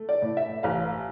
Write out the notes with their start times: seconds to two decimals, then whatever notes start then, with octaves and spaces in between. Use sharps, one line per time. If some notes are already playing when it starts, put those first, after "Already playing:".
Already playing: A3
0.09 D5
0.22 A2
0.37 E5
0.63 A1 F5